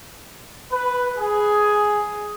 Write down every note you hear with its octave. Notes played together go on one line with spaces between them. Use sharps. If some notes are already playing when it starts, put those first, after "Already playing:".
B4
G#4